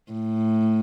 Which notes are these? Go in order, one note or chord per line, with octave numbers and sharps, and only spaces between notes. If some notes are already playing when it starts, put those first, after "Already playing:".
A2